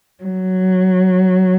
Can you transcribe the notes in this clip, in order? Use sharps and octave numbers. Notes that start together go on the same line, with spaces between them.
F#3